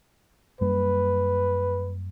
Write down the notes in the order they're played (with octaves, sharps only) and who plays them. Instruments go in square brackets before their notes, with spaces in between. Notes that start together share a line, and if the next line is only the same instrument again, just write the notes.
[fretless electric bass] F#2 G3 A#3 [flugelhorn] B4